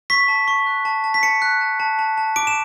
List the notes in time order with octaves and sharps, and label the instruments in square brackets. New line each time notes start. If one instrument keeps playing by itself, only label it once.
[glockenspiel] C#6 B6
A5
C#6
F#6
A5
A5
B6
A5 C#7
F#6
A5
A5
A5
A5
D6 D7
E7